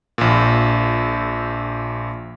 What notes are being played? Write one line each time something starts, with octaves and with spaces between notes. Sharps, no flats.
A#1 A#2